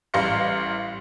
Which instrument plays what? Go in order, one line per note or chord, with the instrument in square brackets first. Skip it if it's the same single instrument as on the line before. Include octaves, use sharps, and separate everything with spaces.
[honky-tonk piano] A1 G3 F5 C6 A#6 C#7